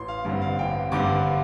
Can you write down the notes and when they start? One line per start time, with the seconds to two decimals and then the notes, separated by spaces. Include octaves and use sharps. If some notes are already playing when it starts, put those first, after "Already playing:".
Already playing: A1 C6
0.08 F5
0.25 G2 D3 G3 C4
0.41 F5
0.59 A1 G5
0.91 G2 D3 G3 C4 D6